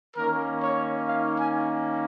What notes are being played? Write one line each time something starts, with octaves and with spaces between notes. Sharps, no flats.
D#3 A#3 C#4 A#4
C#5
F5
G#5